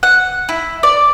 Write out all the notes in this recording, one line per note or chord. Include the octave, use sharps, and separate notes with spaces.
F#5
E4
D5